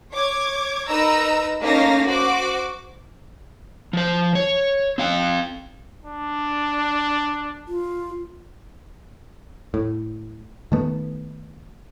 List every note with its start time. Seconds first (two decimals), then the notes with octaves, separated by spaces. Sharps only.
0.12 C#5 D6 G#6
0.87 D#4 A#4 B4 D#5 A#5 E6
1.61 A3 A#3 C#4 D#4 F5 A#6
2.06 F#4 C5 D6
3.93 F3 C5
4.35 C#5
4.98 C4 F5 G5
6.06 D4
7.68 F4
9.74 A2
10.72 D#3 A3 B3